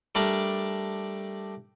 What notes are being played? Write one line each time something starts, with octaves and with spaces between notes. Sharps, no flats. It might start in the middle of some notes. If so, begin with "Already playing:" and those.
G3 A3 D4 A#4 D5